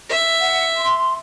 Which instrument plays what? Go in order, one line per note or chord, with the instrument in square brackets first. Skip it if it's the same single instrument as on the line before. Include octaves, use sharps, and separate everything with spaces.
[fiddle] E5
[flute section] F#5
C6